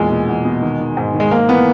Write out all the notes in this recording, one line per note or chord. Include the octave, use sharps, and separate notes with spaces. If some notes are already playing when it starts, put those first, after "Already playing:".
Already playing: E2 A#2 G#3
B2
E2
B2
D#3
D#3
G#2
D#3
G#3
G#2 A#3
E3 B3